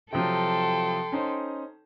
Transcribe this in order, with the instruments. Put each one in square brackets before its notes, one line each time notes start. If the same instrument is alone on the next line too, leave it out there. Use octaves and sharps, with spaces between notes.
[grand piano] C3 F3 F#3 [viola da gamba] A4 [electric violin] G5 C6
[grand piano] C#4 D#4 C5